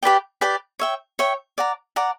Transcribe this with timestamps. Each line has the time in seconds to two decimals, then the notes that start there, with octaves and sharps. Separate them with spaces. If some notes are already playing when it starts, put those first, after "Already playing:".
0.03 G4 B4 D5 G5
0.41 G4 B4 D5 G5
0.79 C#5 E5 G5
1.19 C#5 E5 G5
1.58 D5 F#5 A#5
1.96 D5 F#5 A#5